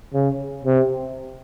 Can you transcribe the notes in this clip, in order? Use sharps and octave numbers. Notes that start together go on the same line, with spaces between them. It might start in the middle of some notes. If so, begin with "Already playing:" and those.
C#3
C3